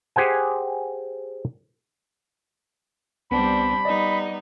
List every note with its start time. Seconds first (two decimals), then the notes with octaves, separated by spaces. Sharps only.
0.16 G4 G#4 C5 F#5 G#5
3.31 C2 G3 B3 C4 D4 B5
3.85 G3 B3 D#4 D5 D#5